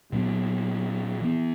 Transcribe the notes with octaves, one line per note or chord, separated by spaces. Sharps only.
A#2 F#3 B3
E3 B3